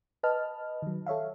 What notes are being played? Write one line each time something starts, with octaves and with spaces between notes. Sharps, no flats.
B4 D#5 A5 F6
D#3 F#3
A4 C#5 E5 F5